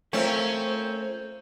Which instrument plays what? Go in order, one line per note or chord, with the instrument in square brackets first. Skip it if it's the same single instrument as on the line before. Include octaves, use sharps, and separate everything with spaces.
[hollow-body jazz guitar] A3 F4 A#4 [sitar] C4 C#4 [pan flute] C5